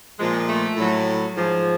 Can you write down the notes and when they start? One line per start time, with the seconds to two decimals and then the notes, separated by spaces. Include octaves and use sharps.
0.19 A#2 F3 G#3
0.49 A3
0.77 A2 F#3
1.36 G#2 F3